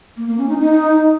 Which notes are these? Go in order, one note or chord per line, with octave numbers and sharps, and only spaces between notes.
A#3
A#3
C#4
D#4
D#4